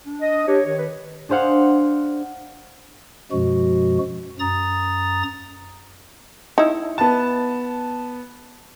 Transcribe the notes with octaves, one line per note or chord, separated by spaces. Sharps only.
D4
D#5
D4 G4 C#5
D#3 C#5
B4
D4 G#4 C5 F5 F#5
F#2 B2 F3 G#3 F#4
F#2 A#5 D#6 A6
D#4 E4
B3 A5